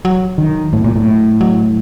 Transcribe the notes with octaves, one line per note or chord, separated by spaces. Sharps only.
F#3
D#3
A2
A#2
A2
F#3